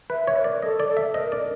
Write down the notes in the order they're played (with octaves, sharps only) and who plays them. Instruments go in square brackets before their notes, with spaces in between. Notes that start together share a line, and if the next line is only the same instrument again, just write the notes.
[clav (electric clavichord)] B4 [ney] E5
[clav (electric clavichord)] C#5
[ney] C5
[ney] A#4 [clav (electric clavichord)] D5
[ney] A4 [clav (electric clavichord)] D#5
[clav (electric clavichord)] D5
[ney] A4
[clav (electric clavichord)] E5
[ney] A#4 C5 [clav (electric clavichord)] D#5
[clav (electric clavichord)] D5